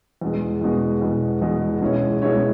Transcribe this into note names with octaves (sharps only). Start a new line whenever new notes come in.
E2 B2 G#3
E2 B2 G#3
E2 B2 G#3
E2 B2 G#3
B2 G#3 C#4 E4 C#5
B2 G#3 C#4 E4 C#5